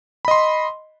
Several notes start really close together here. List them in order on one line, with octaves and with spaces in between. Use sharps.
B5 D#5 C6